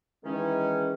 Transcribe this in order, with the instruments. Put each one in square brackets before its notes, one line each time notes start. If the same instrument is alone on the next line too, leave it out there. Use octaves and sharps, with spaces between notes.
[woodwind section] D#3 C#4 [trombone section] E3 G#3